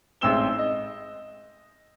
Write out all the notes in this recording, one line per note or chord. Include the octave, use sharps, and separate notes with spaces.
A1 G#2 C4 E6 E7 G7
D#5